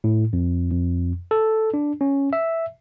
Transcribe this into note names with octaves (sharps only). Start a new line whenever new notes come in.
A2
F2
F2
A4
D4
C#4
E5